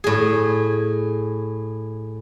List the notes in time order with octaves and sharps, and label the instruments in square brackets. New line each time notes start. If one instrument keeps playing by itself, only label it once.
[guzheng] A2 G#4